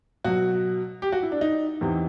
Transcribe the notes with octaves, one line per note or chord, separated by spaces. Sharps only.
B2 F#3 F#4
G4
F#4
E4
D4
D#4
E2 C3 E3